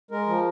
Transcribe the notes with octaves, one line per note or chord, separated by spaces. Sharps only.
G#3 A#4
F3